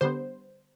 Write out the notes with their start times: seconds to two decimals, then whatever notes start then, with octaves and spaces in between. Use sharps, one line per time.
0.01 D3 G3 B3 C5